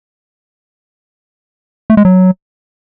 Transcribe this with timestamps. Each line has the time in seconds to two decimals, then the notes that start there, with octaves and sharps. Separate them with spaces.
1.90 A3
1.97 G#3
2.05 F#3